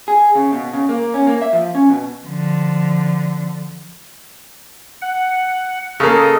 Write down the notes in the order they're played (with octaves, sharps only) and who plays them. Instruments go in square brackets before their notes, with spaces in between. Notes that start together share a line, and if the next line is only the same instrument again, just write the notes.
[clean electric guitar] G#4
C#3
B2
C#3
A#3
C#4
A#3
E5
F3
C#4
B2
[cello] D3 F3
[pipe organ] F#5
[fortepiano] C#3 A#3 [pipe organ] A4 D#5